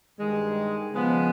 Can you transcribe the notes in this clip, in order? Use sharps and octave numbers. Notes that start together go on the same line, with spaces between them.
G2 D#3 G#3
C#3 F3 G#3 B3